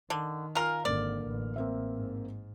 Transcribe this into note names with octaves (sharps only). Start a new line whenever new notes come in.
D3 D#3
F4 A#4 G#5 F6
G#1 D3 A#3 D5
A1
A#3 C4 E5
G#2